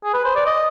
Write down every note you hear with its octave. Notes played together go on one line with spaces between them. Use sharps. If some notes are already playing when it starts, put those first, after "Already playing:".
G#4
B4
C5
D5
D#5